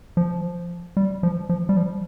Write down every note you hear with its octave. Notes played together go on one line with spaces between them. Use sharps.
F3
G3
F3
F3
G3
F3